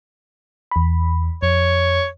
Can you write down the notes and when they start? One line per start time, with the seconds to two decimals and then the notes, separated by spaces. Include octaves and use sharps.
0.71 E2 B5
1.43 F2 C#5